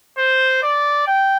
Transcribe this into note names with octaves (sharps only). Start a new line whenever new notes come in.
C5
D5
G5